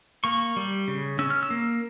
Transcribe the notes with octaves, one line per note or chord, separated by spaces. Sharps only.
A#3 C#6
G3
C#3
C#4 E6
F6
E6
A#3